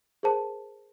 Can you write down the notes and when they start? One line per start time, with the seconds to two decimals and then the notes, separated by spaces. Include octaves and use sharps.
0.23 G#4 A#4 C5 A5